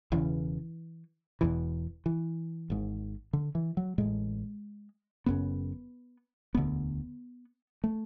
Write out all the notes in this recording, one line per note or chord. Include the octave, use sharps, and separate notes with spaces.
E1 E2 C#3 E3
E1 E2 B2 E3
E3
G#1 G#2
D3
E3
F#3
A1 A2 G#3
F#1 F#2 C#3 B3
E1 D2 D3 B3
A3